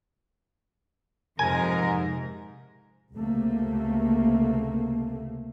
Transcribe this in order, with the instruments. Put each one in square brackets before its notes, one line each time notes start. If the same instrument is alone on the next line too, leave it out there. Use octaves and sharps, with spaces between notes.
[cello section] F2 A#4 [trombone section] G#2 [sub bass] C3 [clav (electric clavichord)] G#5
[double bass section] C#2 C3 A3 A#3